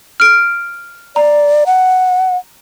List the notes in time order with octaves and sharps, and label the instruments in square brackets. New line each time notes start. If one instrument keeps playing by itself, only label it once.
[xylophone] F6 D7
[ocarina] D5 [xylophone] A#5
[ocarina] F#5